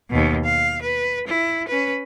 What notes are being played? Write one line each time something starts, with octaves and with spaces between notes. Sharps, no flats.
D#2 B2
F5
B4
E4
C#4 B4